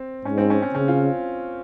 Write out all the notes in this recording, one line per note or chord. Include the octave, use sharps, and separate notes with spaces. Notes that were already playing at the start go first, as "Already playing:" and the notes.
Already playing: C4
G#2 C#4
C4
C#4
C#4
C#3 C#4
F4